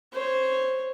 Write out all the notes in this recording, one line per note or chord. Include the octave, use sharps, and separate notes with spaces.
C5 C#5